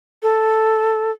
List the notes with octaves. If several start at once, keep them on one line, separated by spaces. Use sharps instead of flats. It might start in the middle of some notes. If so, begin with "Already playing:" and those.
A4